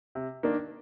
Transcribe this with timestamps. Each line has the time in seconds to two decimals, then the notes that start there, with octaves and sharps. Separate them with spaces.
0.15 C3
0.43 D#3 A#3 D4